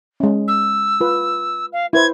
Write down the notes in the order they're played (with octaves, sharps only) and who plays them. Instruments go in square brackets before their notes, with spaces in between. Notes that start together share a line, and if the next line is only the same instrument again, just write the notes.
[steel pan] G#3 C#4
[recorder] E6
[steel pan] F4 B4
[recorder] F5
[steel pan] E4 B4 C5 [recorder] G#6